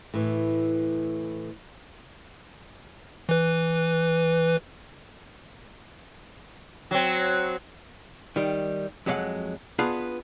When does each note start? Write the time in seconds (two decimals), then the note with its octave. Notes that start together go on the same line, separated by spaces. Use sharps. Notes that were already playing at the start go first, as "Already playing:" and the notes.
0.14 A2 E3
3.29 E3 B4
6.91 F#3 C4
8.36 D#3 G3
9.06 F2 F#3 G#3 G4 F5 F#5
9.79 B3 D4 F4 G#4 B4